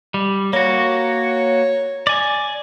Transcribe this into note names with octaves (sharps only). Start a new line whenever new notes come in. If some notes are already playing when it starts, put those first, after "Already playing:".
G3
A#3 F#4 C#5
D5 G#5